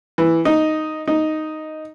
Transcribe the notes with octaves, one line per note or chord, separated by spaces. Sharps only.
E3
D#4
D#4